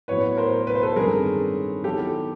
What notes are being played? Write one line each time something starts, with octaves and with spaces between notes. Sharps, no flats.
A2 F#3 B3 B4 C#5
A#4 C5
B4
C5
A4 B4
G2 D#3 G#3 C4 G#4 A#4
D#3 F#3 B3 E4 G4 A4